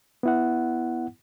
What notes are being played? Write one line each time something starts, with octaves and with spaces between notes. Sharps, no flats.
B3 E4 F#5